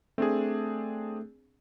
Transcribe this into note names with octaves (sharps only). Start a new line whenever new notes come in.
A3 C4 D4 G#4